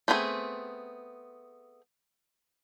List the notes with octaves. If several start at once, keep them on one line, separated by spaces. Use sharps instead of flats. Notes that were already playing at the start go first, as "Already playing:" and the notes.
A3 B3 C4 F4 G#4